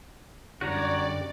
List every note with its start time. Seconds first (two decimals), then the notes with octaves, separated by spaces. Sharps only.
0.61 F#2 D3 G3 F#4 G4 C#5 D5 A#5